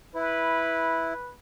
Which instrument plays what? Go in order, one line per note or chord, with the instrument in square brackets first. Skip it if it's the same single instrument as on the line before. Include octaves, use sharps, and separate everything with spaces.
[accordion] E4 [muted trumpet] B4